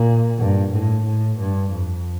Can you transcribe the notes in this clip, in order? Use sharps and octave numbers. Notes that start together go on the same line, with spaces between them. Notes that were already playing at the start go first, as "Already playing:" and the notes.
Already playing: A#2
G2
A2
A2
G2
F2